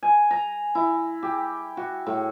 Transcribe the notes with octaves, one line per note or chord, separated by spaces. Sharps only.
G#5
A#5
E4
G4
F#4
A2